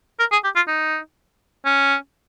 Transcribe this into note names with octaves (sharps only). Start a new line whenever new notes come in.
A#4
G#4
G4
F4
D#4
C#4